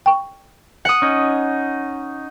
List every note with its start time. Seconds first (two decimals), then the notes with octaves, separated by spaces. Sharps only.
0.06 G5 C#6
0.85 F#5 D#6
1.02 C#4 D#4